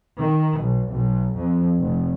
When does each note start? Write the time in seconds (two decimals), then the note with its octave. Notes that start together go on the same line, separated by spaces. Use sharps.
0.19 D#3
0.60 B1
0.92 B1
1.38 F2
1.78 F1